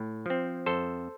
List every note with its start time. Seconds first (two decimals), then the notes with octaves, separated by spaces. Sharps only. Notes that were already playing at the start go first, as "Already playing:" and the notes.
Already playing: A2
0.26 F3 C4
0.66 F2 A4 C5